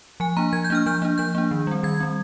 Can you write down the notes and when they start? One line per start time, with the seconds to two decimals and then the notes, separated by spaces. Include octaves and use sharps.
0.20 F3 G#5
0.37 A#3 D4 A#5
0.53 F3 G#6
0.64 G6
0.70 A#3 D4 F6
0.86 F3 G6
1.02 A#3 D4
1.18 F3 G6
1.35 A#3 D4
1.51 D#3
1.67 G3 C4
1.83 D#3 G#6
2.00 G3 C4